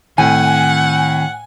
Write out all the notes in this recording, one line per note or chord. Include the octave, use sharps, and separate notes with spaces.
A2 D#3 C4 F#5 G#5